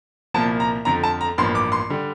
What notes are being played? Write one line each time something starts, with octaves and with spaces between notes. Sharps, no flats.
C2 A#2 F3 A#3 A5
A#5
F2 D3 F3 A#5
A5
A#5
A1 G2 F3 A#3 C6
D6
C6
D3 G3